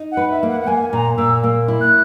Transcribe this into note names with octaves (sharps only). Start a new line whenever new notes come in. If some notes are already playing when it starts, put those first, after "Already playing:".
Already playing: D#4
F#5
B4
E5
A#3
F#5
F#5
A#3 G#5
A#2 A#5
A#2 E6
A#3
E4
F#6